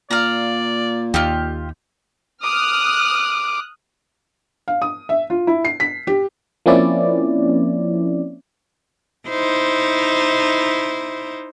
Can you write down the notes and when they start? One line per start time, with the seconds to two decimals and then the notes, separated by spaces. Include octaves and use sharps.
0.11 A#2 D5 F5 A#5
1.14 D#2 F4 G4
2.44 D6 D#6 F6 F#6
4.68 F5
4.82 D#6
5.09 E5
5.30 F4
5.47 E4
5.65 C7
5.80 B6
6.07 G4
6.66 F3 A#3 C4 C#4 E4 D5
9.29 D#4 E4 C5